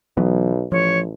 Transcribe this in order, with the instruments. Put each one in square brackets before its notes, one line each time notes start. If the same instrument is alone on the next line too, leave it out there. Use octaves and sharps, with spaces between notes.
[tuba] B1 [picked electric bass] E3 F#3 B3
[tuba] A1 [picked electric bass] F3 [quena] C#5